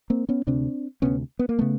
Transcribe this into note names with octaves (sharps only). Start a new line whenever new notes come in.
A#3 C4
B3 C#4
D2 C3 C4 D4
D2 C3 B3 C#4
B3
A#3
C#3 A3 B3